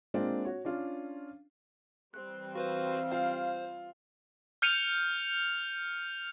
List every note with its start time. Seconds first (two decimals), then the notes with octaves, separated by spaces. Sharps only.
0.14 G#3 A#3 C4 D4 F4
0.45 F#4 C#5
0.65 C#4 D4 F4
2.14 E3 G3 C4 F#6
2.55 F#4 B4 C5 F5
3.12 F4 C5
4.62 F6 G6 C#7 D#7 F7